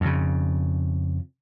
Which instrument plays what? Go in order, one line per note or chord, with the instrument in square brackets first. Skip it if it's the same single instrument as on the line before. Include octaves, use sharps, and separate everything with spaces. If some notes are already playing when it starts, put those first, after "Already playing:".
[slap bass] F2 C#3